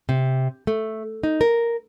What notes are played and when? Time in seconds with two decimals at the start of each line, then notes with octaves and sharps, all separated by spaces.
0.09 C3
0.67 A3
1.23 D#4
1.41 A#4